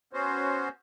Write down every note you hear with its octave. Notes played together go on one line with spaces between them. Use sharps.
B3 C#4 F#4 C5